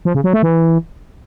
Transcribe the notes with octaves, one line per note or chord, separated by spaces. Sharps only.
F3
C#3
F#3
A3
E3